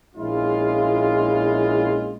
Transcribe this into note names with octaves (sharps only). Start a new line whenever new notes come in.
A#1 G#3 C#4 E4 F4